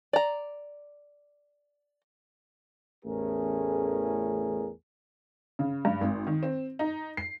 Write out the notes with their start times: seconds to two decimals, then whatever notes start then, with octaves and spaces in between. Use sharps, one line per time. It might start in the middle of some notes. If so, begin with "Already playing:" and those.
0.13 D5 A#5
3.05 A1 E2 A3 C#4 G#4 A#4
5.59 C#3
5.85 G2
6.01 G#1
6.27 D#3
6.43 C4
6.79 D#4
7.17 C7